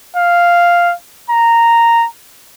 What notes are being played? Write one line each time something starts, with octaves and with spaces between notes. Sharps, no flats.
F5
A#5